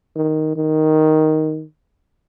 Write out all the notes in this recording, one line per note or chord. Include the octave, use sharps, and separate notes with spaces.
D#3
D#3